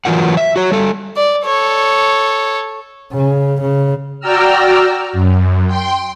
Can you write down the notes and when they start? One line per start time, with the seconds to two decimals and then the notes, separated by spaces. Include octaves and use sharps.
0.05 E3 F#3 F4 A#4 F#5
0.37 E5
0.56 F#4 C#5
0.72 G3 A4
1.16 D5
1.45 A4 C#5
3.12 C#3
3.61 C#3
4.20 F#4 D5 G5 A#5 E6 F6
5.13 F#2
5.67 G5 C6